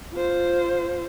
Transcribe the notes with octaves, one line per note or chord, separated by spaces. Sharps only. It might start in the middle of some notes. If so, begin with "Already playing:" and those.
F4 C5